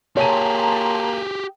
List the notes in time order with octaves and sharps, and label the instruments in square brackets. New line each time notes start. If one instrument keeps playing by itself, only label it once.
[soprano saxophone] A#3 [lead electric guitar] G4 G#4 [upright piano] C#5 D#7 [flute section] A5 A#5 C6